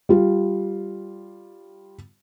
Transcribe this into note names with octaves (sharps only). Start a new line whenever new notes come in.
G3 F4